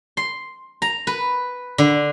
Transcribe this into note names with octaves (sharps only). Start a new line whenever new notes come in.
C6
A#5
B4
D3